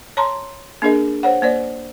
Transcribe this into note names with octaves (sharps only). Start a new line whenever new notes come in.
C#5 A5 A#5 C6
A#3 D4 G#4 A#4 D#5
C5 C#5 F#5
A#3 C5 D5